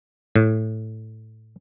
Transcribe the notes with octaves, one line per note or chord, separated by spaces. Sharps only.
A2